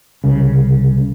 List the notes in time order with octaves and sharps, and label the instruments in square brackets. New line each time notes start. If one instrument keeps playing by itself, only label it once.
[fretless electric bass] C2 C#3